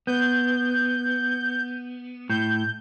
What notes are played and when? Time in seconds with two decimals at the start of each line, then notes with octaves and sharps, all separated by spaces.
0.07 B3 G6
2.30 A2 G6